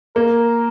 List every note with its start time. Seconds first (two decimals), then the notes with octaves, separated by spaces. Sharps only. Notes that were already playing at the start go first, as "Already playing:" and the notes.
0.16 A#3 A#4